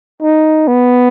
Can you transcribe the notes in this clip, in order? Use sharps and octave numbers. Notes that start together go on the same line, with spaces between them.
D#4
B3